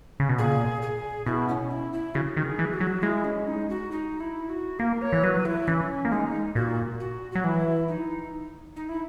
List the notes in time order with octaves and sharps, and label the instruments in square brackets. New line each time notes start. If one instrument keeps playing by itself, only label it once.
[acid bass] C#3
B2
[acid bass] A#2 [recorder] G#4
[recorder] G#4
[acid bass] B2 [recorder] E4
[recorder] C#4
E4
E4
[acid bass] C#3 [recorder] F#4
[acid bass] D#3
[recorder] G#4
[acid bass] E3
[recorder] F#4
[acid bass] F#3
[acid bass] G#3 [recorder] E4
[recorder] C#4
D#4
F#4
D#4
E4
F#4
[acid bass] A#3 [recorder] A#4
[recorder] C#5
[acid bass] E3
[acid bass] F#3 [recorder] B4
[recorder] E4
[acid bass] E3 [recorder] C#4
[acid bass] A#3
[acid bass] G#3 [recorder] D#4
[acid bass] A#2 [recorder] F#4
[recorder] F#4
[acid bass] F#3 [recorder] F#4
[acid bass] E3 [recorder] E4
[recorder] D#4
D#4
E4